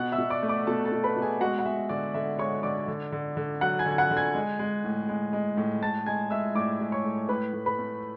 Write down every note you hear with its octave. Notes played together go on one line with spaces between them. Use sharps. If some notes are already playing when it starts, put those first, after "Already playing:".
Already playing: B2 F#5 F#6
E5 E6
B2
D5 D6
A3
D5 D6
B2 A4 A5
A4 A5
B2
B4 B5
B2
G#4 G#5
G#3 F#4 F#5
F#5
G#3 E5
D3 D5
D3 E5
G#3 C#5 C#6
D3 D5 D6
D3
D3
D3
F#3 F#5 F#6
G#5 G#6
D3
G#6
F#5 F#6
D3
G#5 G#6
G#3
G#3
A2
G#3
G#3
A2
A2 A5 A6
G#3 G#5 G#6
G#3 E5 E6
A2 D5 D6
G#3
C#5 C#6
A2
A2 B4 B5
A2
B4 B5
A3